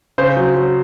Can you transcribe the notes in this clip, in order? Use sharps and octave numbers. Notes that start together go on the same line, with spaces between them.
C#3 C5
F#3
F#3